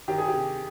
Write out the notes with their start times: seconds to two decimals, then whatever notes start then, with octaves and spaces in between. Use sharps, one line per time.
0.08 D#3 G4
0.18 G#4
0.28 G4
0.34 C3